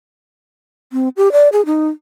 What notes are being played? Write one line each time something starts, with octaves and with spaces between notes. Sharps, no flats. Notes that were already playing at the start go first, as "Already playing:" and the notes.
C4
G4
D5
G#4
D#4